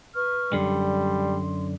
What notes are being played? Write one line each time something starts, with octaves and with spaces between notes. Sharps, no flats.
B4 C#6 F6
F#2 D3 G3 C6